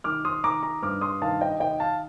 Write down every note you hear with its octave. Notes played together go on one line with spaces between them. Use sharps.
D#3 D6 F6
C6 D#6
D#3 A#5 D6
A#5 D6
G2 D6 F6
C6 D#6
D#3 F5 A5
D#5 G5
D#3 D#5 G5
F5 A5